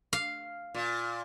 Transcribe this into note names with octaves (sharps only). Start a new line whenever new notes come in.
F5
A#2